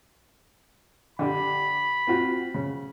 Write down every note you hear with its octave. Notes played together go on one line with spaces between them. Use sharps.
D3 D4 G4 B5
C4 F4 F#4
C#3